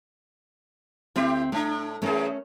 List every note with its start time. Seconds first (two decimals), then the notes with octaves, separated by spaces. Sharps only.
1.16 D2 C4 E4 G4 E5
1.52 A2 A3 D4
2.02 E2 A3 C#4 G#4 A#4